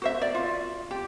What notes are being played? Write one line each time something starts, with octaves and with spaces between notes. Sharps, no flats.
F#4 C5 E5
D5
F4
G4